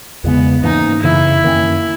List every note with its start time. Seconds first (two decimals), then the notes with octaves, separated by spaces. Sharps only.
0.24 E2 C#3 G#3 B3
0.63 G#2 E3 A#3 C#4 D#4
1.03 F#2 C#3 E3 E4
1.44 F#2 D#3 A#3 C#4